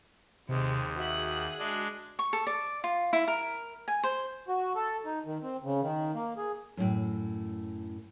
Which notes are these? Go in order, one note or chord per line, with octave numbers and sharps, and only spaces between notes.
D#2 C3 G#3 C4
F#4 G#4 E5 F#6
G#3 D4
C#6
A4
D5
F4
E4
A#4
G#5
C5
F#4
A4
D#4
D#3
C4
C#3
D#3
A#3
G#4
F#2 A2